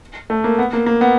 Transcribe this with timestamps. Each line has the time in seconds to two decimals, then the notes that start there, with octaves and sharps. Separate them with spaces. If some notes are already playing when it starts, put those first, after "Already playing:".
0.30 A3
0.44 A#3
0.59 B3
0.73 A#3
0.86 A#3
1.01 B3